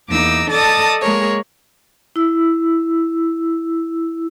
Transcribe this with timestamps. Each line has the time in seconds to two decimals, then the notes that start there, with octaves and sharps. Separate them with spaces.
0.10 E2 A#3 D#4 D6 E6
0.50 A4 D5 D#5 A5 D#6 A6
1.01 G#3 A#3 G#4 A#4 C#5
2.16 E4 E6